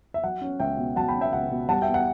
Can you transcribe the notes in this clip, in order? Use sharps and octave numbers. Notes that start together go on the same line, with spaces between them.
E5
F#3 F#5
C#4
C#2 E5 G5
B2
F#3 F#5 A5
G5 B5
C#4
E5 G5
C#2 F#5
B2
G3 F#5 A5
E5 G5
E2
F#5